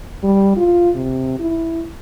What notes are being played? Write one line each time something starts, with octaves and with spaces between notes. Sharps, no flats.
G3
F4
C3
E4